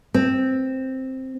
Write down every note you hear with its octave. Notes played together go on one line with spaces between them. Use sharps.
C4